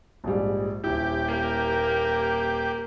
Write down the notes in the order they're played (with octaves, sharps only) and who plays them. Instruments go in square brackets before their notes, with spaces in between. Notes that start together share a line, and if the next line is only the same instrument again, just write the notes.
[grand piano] A#1 G#2 G3
[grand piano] D#1 E4 [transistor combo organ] G4
[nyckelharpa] A#3 A#4